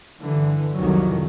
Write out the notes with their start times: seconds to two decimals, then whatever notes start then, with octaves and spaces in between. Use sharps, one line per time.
0.21 G2 D3 E3
0.74 C2 F2 D#3 F#3